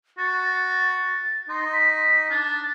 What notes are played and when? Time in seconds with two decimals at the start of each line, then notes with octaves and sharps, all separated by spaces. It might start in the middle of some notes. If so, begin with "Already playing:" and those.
0.18 F#4 A6
1.49 D#4 C6
1.73 B6
2.30 D4 A6